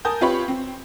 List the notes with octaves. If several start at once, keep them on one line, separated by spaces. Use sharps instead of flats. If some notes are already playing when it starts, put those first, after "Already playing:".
A#4 G#5 A5 D#6 G6
C4 F4 G4 B4 C#5 B5
C4